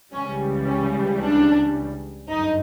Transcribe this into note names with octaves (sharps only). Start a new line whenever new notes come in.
C#2 C#3 E3 G3 C#4
C#4
D4
G1 F#2 D3 F#3 D#4